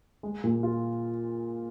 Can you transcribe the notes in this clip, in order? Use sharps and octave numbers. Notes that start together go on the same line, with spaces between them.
G#3
A#2
F4